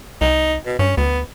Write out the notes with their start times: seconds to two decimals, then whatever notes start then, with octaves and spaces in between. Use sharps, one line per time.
0.21 C2 D#4
0.66 B2
0.79 G2 C#4
0.97 D2 B3